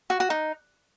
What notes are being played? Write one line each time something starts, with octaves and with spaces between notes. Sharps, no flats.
F#4
F#4
D#4